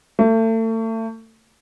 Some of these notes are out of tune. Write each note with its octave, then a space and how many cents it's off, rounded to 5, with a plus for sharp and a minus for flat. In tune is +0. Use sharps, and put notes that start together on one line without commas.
A3 +35